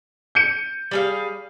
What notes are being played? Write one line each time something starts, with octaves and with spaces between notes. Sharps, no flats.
G6 C#7 D#7
G3 G#4 F5